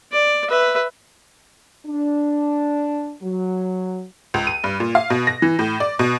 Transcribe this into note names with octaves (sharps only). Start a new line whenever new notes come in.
D5
B4 E5
D4
F#3
C#2
D#7
G2
A#2
F5
B2
A#6
E3
A2
D5
B2